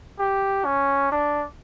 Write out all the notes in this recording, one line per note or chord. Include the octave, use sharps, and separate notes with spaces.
G4
C#4
D4